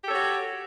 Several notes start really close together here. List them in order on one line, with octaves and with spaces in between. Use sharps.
G4 A4 C#5 F#4